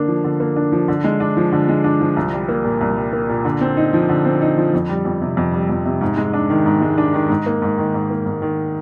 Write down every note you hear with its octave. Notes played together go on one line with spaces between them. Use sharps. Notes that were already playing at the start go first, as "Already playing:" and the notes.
Already playing: D3 A#3 D4
F3
D3
A#3
D4
F3
D3
G#3
D4
F3
D3
G#3
D4
F3
C2
G3
A#3
A#2
C2
G3
A#3
A#2
D3
C4
D#4
F3
D3
C4
D#4
F3
F2
G3
F2
C3
F2
G3
F2
C3
G#2
G#3
D4
D#3
G#2
G#3
D4
D#3
G#2
A#3
G#2
D#3
G#2
A#3
G#2
D#3